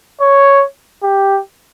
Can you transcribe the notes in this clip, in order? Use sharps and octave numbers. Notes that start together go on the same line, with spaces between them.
C#5
G4